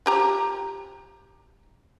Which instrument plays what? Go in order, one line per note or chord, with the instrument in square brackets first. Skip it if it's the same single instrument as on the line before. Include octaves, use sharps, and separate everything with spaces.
[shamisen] F3 G4 A#5